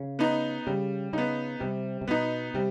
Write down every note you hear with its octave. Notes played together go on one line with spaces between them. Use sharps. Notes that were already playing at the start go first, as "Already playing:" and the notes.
Already playing: C#3
B3 D#4
C#3 G3
C#3 B3 D#4
C3 G3
C3
B2 B3 D#4
C3 G3